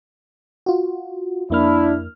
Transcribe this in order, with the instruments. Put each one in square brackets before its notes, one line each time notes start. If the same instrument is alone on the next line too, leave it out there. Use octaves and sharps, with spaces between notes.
[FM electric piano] F4 F#4
[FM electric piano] F2 A#3 F6 [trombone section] D4 E4